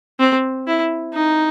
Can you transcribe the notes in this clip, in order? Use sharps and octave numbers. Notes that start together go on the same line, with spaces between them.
C4
E4
D#4